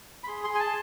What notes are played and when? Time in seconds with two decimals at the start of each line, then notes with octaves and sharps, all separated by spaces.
0.24 B5
0.27 G#4 C6
0.44 C6
0.50 G#4
0.55 G#5
0.60 A5